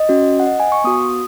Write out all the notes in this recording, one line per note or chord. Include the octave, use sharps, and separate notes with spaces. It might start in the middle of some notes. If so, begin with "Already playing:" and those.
Already playing: D#5
C#4 F#4
F#5
D#5
G#5
C#6
B3 F#4 D#6